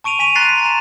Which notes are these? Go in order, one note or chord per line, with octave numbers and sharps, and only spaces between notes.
A5 C#6 D7 D#7 F7
G#5 B6 D#7 F7
A#5 C6 F#6 A6 B6 C7
B6
A#5 E7